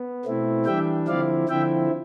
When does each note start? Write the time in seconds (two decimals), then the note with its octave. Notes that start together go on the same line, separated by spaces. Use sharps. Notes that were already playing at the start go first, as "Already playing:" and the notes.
Already playing: B3
0.25 B2 A3 C4 E4
0.66 E3 G3 D4 E5 G5
1.07 D3 F3 C4 E4 D5 F5
1.49 D3 F3 C4 E4 E5 G5